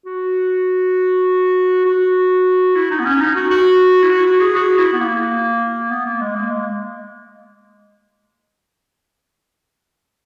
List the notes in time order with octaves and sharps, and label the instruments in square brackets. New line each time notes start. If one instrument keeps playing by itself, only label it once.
[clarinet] F#4
F#4
E4
D#4
B3
C#4
D#4
F#4
F#4
E4
F#4
F#4
G#4
F#4
E4
B3
A#3
B3
A#3
G#3
A#3
G#3